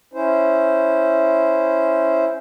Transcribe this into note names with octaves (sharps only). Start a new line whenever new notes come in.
C#4 E4 C5